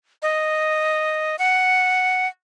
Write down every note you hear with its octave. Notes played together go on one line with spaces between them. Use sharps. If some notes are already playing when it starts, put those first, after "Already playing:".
D#5
F#5